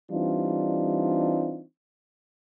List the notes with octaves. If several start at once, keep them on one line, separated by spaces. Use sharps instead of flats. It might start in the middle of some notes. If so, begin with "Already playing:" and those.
E3 G3 C4 D4 D#4 F4